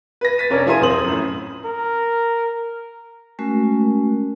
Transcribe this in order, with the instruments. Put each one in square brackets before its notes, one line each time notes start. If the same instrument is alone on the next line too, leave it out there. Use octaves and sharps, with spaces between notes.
[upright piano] B4 A#6
A6 B6 D#7
F1 C#4 D4 A#4 C#5
F3 E4 G#4 A#4 C6 D#7
D#1 F2 C5 D#6 F#7
F#2 A2
[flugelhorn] A#4
[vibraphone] G#3 A3 C#4 F#4 A#4